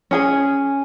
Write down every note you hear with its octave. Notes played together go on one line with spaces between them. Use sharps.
C#4 G#4 G#5